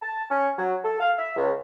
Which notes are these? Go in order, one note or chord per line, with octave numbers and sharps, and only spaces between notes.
A5
C#4
F#3
A4
F5
E5
C#2